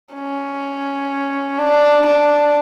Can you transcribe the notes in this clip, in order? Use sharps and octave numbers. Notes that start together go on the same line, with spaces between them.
C#4
D4
D4